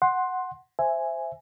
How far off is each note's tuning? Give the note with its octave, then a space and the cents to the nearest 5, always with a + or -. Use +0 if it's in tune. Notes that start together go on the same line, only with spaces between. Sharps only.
F#5 +0 C6 +10
C5 +0 E5 +10 G#5 +0